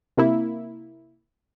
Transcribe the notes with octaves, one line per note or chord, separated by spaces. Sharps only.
C3 A#3 E4